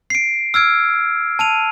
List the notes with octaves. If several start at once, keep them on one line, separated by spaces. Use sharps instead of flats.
C7 D7
E6 F6 G#6 D7
A5 D#7 F7